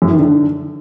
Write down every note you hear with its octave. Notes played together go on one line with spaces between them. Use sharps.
F#2
E3
D#3
D3